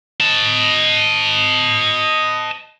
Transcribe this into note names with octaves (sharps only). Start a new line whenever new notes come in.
D#5 A5